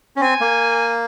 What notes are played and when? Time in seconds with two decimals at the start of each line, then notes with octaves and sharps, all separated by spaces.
0.16 C#4
0.21 C4 G#5
0.41 A#3